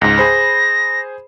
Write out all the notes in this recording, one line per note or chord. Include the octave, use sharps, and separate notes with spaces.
C#2 G#2 A#6
G#4 C5 B5